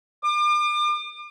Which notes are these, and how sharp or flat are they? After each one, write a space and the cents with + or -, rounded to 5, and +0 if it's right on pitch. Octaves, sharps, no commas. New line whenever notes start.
D6 +40